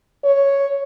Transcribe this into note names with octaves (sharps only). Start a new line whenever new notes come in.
C#5